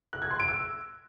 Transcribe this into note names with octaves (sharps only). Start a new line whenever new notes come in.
F#6
G#6
C6
D7
E6